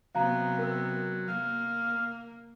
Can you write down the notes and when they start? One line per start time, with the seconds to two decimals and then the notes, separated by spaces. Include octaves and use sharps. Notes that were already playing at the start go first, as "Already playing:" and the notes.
0.15 C3 F#3 B3 F5 A#5
0.59 A#4 E6
1.28 A#3 F5